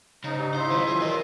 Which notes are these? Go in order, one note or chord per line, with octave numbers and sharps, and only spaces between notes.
G#2 C#3 D#4
D4 G4 D5
E4 C5 F5 C6
D#3 F#3 C#4 F4
F4 G#4
A#2 E3 F#3 A#4 B4 D#5